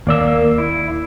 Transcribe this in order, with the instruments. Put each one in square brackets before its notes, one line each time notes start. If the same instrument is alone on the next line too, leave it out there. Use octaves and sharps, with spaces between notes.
[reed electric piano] D#2 D5 E6 [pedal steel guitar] A#3
[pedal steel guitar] E4